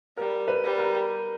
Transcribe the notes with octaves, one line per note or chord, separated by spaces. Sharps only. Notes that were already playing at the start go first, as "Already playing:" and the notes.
G3 A#4
B4
G3
A#4